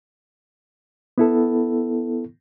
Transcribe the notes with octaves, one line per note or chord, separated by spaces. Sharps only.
B3 E4 A4